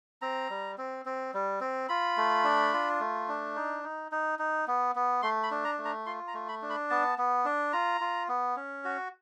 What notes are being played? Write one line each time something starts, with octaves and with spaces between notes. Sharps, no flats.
C4 A#5
G3
C4
C4
G3
C4
F4 B5
A3
D4
F4
A3
D4
D#4
D#4
D#4
D#4
B3
B3
A3 C6
B5
D4
A#5
A3
A#5
F4 C6
A#5
A3
B5
D4
B5
B3 A5
B3
D4
F4 A#5
F4
B3
C#4
F#4